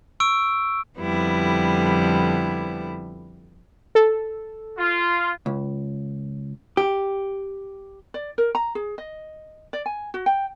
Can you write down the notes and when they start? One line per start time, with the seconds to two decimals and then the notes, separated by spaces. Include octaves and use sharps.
0.20 C#6 E6 D7
0.98 F2 D3 G3 B3 E4
3.95 A4
4.77 F4
5.46 C#2
6.77 G4
8.14 D5
8.38 A#4
8.55 A#5
8.75 G#4
8.98 D#5
9.73 D5
9.86 G#5
10.14 F#4
10.26 G5